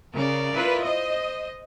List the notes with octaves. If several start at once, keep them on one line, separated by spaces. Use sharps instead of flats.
C#3 A#4 D5
E4 F4 B4
C5 D#5